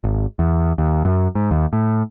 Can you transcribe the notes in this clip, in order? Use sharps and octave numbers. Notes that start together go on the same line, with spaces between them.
G#1
E2
D#2
F#2
G#2
D#2
A2